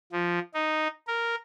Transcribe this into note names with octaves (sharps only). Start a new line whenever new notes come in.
F3
D#4
A#4